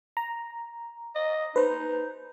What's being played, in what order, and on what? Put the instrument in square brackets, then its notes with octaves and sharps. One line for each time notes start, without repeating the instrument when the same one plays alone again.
[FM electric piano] A#5
[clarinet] D#5
[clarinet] D#4 [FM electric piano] B4 C5